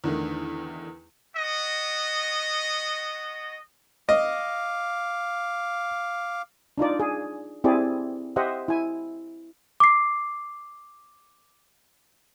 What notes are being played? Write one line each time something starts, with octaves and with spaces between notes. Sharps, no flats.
E2 D3 D#3 A3
B3 F#4 D#5
D#5 F5 D6
D4 D#4 F4 D5
G#4
C4 E4 G4 G#4 D5
G4 C5 D#5 E5 F#5
E4 G#5
D6 C7